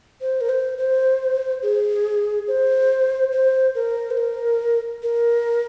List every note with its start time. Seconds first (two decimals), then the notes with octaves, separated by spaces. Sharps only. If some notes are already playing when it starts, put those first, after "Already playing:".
0.21 C5
0.41 A#4
0.49 C5
0.78 C5
1.63 G#4
2.48 C5
3.32 C5
3.75 A#4
4.11 C5
4.17 A#4
5.03 A#4